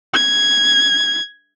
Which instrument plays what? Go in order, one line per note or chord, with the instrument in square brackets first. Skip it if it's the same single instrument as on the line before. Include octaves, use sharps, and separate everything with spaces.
[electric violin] G#6